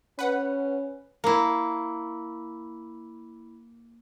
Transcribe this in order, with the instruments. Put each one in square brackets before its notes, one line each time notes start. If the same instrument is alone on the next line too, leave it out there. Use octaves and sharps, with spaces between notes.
[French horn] C#4 [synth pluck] B4 F#5
[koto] A#3 E4